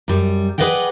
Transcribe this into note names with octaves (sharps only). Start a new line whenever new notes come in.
F#2 G3
G#4 B4 D5 D#5 F#5 G5